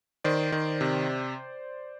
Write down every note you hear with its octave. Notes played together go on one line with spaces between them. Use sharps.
D#3 C5 D5
D#3
C3